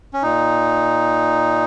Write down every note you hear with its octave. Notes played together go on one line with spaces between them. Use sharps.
C#4
A#2 D#4